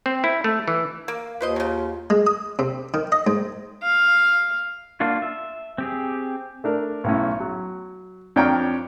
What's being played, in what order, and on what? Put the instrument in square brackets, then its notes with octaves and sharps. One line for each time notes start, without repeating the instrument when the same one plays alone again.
[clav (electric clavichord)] C4
E4
A3
E3
[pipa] A#3 [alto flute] F5
[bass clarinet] D#2 [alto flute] F4 [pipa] B4 C5 D#5
[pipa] C#3 F#3
[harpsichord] G#3
D#6
C3
D#3
D#5
G#2
[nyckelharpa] F5
[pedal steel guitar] A#3 D4 F4 F#4
E5
C4 G4 G#4
[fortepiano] A3 D4 A#4
B1 A2 C#4
F#3
F2 D4 C#5 G5 A#5 F6